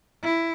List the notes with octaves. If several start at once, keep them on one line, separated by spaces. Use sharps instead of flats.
E4